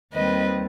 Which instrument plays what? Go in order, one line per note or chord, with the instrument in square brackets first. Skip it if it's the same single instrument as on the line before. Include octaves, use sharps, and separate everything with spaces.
[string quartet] D#2 D#3 G3 C4 B4 D#5